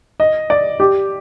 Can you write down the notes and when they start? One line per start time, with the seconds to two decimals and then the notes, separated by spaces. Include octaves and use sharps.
0.20 D#5
0.50 D5
0.80 G4